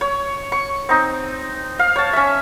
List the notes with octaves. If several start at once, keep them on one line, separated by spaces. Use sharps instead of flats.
C#5
C#6
C4 D#4
F5
C#5 A5
C#4 E5